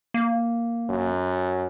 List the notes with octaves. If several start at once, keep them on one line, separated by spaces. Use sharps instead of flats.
A#3
F#2